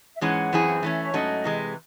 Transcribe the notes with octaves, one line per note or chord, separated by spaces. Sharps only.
E5
G#2 E3 G#3 C#4 F#5
F#2 E3 C4 E4 G#4
E3 A3 C#4 E5
C#5
G#2 F#3 A3 C#4 D#5
C3 E3 G#3